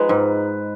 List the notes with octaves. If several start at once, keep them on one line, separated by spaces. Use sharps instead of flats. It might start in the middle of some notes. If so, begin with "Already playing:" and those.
Already playing: F3 G#3 D#4 B4
G#2